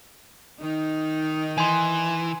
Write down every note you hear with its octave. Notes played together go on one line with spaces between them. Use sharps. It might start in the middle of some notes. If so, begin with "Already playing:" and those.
D#3 D#4
E3 G#5 C6